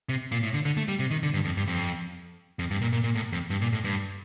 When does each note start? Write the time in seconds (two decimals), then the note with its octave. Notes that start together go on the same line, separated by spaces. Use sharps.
0.09 C3
0.32 A#2
0.43 A2
0.54 D3
0.65 D3
0.77 A3
0.88 G3
1.00 C3
1.11 D#3
1.23 D3
1.34 G2
1.45 F2
1.57 G2
1.67 F2
2.59 F2
2.71 G2
2.81 A#2
2.92 A#2
3.04 A#2
3.15 A2
3.32 F2
3.50 G2
3.61 A#2
3.73 A2
3.84 G2